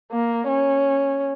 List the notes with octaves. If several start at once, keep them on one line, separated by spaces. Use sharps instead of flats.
A#3
C#4